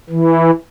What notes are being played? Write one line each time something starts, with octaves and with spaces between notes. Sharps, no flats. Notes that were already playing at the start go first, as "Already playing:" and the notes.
E3